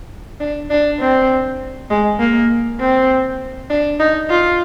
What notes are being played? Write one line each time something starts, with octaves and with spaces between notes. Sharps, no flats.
D4
D4
C4
G#3
A#3
C4
D4
D#4
F4